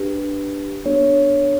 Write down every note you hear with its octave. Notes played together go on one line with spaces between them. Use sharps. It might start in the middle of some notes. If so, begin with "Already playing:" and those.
Already playing: D4 G4 B4
B3 D4 A4 C#5